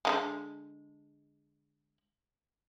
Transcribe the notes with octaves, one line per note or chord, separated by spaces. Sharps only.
D3 E3 G#3